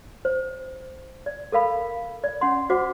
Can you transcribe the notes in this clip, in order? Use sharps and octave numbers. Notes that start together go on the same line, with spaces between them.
C5
D5
A4 A#4 F5 B5
D5
C#4 F#5 C6
F#4 C5 F#5 D6